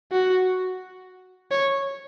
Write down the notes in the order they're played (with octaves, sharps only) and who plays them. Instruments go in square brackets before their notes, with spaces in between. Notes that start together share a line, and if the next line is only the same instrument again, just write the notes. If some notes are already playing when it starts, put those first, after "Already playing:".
[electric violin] F#4
C#5